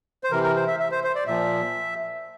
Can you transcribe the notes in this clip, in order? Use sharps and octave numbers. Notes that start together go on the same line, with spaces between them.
C5
C3 E3 A#4
A#4
C5
E5
E5
C5
C5
D5
A#2 F3 E5